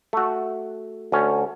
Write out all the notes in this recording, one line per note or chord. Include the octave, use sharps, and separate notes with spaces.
A3 F#4
D2 C#4